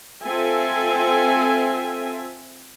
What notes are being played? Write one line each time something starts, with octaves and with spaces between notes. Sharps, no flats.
C4 F4 A4 E5 G#5